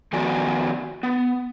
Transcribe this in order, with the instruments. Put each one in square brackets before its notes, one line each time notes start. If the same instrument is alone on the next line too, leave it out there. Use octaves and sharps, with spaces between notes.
[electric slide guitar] D#3 F3 B3 F#4 D5 G#5
B3